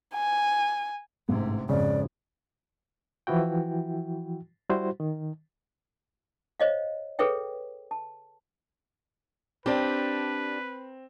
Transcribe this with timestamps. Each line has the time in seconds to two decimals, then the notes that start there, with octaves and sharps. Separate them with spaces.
0.14 G#5
1.29 A1 G#2 C3
1.69 G#1 F2 C#3 D5
3.27 E3 F3 E4 F#4 G5
4.69 G3 E4 F#4 C5
5.00 D#3
6.60 C5 C#5 D#5 F5
7.19 G#4 A4 B4 C#5 E5 G5
7.91 A5
9.66 C4 D4 G4 B4